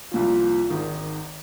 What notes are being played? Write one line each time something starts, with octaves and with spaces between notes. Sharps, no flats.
C2 A#2 F3
G#1 G#2 D#3